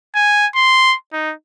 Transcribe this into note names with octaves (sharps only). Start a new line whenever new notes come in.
G#5
C6
D#4